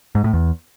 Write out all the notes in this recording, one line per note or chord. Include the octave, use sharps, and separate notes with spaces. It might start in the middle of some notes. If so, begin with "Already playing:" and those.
G#2
A2
E2